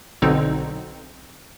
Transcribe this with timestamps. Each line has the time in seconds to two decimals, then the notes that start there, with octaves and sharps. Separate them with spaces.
0.22 B1 B2 D3 C4 D#4